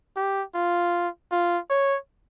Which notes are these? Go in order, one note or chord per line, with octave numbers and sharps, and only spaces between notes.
G4
F4
F4
C#5